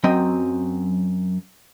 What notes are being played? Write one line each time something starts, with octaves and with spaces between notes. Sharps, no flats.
F#2 F#3 C4 D#5 G5